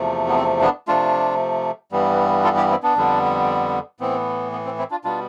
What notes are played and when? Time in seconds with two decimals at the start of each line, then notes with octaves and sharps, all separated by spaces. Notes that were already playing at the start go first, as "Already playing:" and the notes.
Already playing: E2 C3 F3 A3
0.28 B3
0.35 C4
0.62 B3 D4
0.88 C3 F3 A3 D4 F4
1.92 G2 E3 G3 B3
2.44 F4 A4
2.57 E4 G4
2.70 C4 E4
2.83 B3 D4
2.96 F2 D3 G3 B3
4.00 A2 E3 B3 C4
4.52 B3
4.65 C4
4.78 C4 E4
4.91 D4 F4
5.04 B2 G3 B3 D4 F4